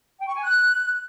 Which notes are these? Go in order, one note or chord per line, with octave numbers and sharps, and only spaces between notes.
G5
C#6
G#5
F#6